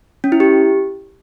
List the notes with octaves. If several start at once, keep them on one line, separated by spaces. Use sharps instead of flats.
C#4
E4
G4